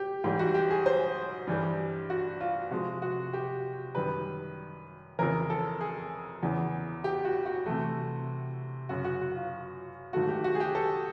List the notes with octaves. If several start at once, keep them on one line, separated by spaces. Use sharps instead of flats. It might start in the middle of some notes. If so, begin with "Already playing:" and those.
Already playing: G4
G#2 E3 G3 G4
F#4
G4
G#4
C5
G2 E3 G3
F#4
F4
C3 F3 G#3 F#4
F#4
G4
F#2 D#3 G3 B4
F2 C#3 E3 A#4
A4
G#4
E2 C#3 E3
G4
F#4
F#4
C3 E3 A3
F#2 C#3 F#3 F#4
F#4
F#4
F4
G#2 D#3 F#3 A3 F#4
G4
F#4
G#4
G4
A4